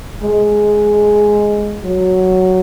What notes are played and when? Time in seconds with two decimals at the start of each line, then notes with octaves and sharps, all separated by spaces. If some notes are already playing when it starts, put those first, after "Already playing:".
0.23 G#3
1.84 F#3